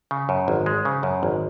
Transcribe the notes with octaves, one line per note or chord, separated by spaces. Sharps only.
C#3
F#2
G#1
G#3
C#3
F#2
G#1